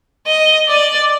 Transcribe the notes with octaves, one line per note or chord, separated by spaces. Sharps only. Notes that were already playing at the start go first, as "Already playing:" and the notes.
D#5
D5